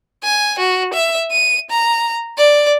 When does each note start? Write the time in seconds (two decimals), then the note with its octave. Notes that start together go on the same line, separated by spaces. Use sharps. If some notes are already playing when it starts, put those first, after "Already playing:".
0.23 G#5
0.59 F#4
0.93 E5
1.31 D#7
1.70 A#5
2.38 D5